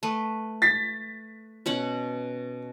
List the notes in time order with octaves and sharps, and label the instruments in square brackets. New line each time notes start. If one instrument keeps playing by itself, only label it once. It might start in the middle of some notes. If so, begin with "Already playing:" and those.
[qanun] A3 B4
[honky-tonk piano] A6 B6
[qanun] B2 C#4 F#5